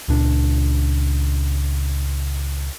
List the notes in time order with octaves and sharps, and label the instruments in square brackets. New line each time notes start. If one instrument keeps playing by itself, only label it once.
[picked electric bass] C#2 A#2 D4